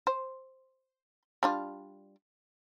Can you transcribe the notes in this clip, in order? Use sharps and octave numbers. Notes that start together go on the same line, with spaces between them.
C5
G3 D4 F4